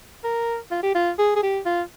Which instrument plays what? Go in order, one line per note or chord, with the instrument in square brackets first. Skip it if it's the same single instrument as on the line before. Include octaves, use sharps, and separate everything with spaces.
[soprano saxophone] A#4
F4
G4
F4
G#4
G#4
G4
F4